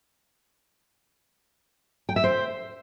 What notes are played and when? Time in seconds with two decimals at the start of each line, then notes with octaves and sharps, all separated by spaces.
2.09 G5
2.16 E5
2.24 C5